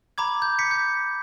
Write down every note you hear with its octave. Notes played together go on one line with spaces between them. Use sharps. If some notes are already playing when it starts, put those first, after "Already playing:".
A#5 B5 D6 G#6
G6
B6 C#7
G6